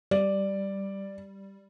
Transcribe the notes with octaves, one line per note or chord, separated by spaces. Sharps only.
G3 D5